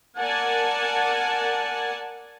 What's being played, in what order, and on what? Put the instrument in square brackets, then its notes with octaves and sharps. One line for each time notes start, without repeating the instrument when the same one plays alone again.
[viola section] A#4 D5 F#5 G#5 A5